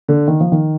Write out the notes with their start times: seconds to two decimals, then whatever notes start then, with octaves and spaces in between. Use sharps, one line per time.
0.08 D3
0.28 D#3
0.40 F3
0.52 D#3